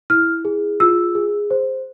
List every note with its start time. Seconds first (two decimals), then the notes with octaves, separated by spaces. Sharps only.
0.10 E4 F6
0.45 G#4
0.80 F4 E6
1.15 G#4
1.51 C5